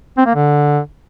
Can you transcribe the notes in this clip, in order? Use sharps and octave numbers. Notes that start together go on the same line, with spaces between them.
C4
A#3
D3